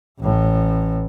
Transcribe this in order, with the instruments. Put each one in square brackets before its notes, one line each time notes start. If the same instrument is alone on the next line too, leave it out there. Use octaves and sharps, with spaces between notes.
[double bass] A1 A2